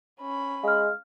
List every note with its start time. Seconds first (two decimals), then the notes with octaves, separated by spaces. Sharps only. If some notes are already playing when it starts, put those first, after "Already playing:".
0.20 C#4 B5
0.63 G#3 F5 F6